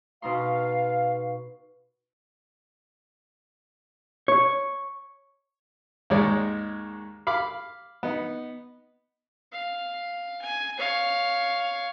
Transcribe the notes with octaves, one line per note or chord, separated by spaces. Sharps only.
B2 D#4 F5 C6
C#5
D#2 G#2 G#3 C#5 D5
F5 B5 D6
B3 D#4
F5
G#5
C#5 F5